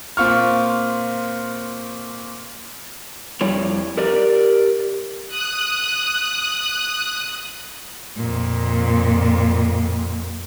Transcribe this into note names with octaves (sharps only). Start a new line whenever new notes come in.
A#2 C4 F4 C#6 F6
F2 G3 E4 C#5 D5
G4 A#4 D5
D#6 F#6
F2 A#2